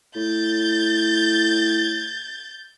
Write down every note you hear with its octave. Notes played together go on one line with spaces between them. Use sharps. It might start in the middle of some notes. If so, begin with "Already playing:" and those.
A2 G6 A6